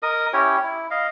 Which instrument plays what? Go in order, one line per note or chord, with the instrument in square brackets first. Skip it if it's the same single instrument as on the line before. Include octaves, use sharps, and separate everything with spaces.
[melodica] A#4 D#5 D#6
C#4 E4 G4 C#5
E4
D#5 F5